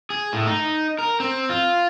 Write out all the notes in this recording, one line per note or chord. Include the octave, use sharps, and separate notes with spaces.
G#4
A2
D#4
A#4
C4
F4